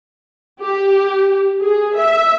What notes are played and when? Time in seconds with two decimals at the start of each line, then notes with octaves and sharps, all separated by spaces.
0.61 G4
1.60 G#4
1.97 E5